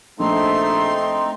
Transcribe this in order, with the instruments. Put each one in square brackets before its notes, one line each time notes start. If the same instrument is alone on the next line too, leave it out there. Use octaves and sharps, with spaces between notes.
[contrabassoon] A#1 [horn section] A3 [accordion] C4 D#4 [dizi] C6